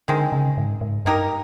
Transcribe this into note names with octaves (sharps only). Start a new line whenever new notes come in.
D3 D#3 G#3 C4
C#3
G#2
G#2
G2 A#3 D#4 G4 A#4